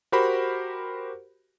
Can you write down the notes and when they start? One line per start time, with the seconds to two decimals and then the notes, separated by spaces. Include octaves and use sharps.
0.12 F#4 G4 A#4 C5 B5